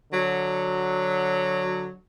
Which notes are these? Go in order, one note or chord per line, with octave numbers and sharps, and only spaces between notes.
D3 F#3